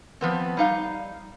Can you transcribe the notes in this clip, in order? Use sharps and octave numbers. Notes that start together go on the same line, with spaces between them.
F3 B3 C4
G3 D#4 F5